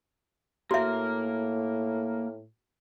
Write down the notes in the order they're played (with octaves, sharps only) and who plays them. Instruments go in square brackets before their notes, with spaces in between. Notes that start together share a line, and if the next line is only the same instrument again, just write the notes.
[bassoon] A2 [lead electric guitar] A#3 A#5 [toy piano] F#4 E5